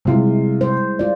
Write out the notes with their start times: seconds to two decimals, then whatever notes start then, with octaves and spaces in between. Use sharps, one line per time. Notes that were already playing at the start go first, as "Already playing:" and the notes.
0.05 C3 G3 G#3 E4 F4
0.61 C5
0.99 F4 D5